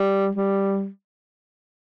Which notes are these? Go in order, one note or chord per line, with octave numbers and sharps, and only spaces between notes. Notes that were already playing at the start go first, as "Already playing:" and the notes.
Already playing: G3
G3